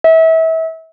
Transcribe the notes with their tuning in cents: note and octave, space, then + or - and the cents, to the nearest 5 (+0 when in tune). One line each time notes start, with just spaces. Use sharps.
E5 -30